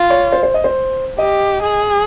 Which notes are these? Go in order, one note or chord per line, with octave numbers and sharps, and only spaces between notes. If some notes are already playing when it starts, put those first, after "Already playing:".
Already playing: F4
C#5
C5
C5
D#5
C5
G4 D#5
G#4